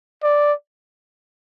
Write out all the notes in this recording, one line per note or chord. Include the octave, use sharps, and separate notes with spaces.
D5